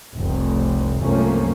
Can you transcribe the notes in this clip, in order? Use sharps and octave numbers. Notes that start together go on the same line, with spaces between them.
F1 C2 C3
C2 F#2 F3 A3 A#3 C#4